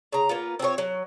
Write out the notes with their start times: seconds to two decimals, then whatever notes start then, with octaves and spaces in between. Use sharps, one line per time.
0.13 C#3 A#5
0.29 A#3 B3 F4
0.59 C4 F4 G#4 C#5
0.78 F#3